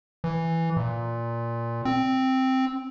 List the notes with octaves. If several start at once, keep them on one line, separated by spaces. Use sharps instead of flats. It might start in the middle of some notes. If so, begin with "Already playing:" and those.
E3
A#2
C4